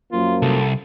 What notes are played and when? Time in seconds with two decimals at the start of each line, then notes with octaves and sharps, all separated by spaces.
0.13 F#2 F3 A#3 F4
0.42 C2 A4